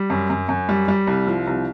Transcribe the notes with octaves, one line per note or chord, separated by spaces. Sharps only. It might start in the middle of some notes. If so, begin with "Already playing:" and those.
Already playing: G3
F#2
F#2
F#2
G3
G3
C2
F3
C2